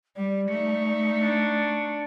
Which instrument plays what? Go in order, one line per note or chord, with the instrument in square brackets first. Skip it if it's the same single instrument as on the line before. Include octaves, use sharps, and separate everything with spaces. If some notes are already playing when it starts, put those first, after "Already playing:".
[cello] G3 [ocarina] D5
[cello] A3 D#4 [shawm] C#6
[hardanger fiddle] D4